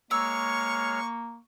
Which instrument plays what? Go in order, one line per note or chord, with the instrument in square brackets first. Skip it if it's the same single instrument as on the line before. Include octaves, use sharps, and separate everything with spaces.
[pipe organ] G#3 C#5 F6 [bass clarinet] A#3 [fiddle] C#6 [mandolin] E6